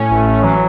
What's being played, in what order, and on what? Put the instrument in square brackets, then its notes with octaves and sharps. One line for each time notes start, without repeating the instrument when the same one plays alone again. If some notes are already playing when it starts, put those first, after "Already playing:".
Already playing: [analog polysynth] A2 C#4
[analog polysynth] A1 [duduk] A3
[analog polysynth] C#4
[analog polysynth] E3 [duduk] F#3